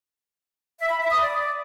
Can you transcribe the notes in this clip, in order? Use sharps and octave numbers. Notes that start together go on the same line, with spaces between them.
E5
B5
E5
D#6
D5